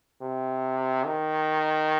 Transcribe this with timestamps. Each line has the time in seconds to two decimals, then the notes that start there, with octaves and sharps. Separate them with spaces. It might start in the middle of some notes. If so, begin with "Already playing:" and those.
0.22 C3
1.05 D#3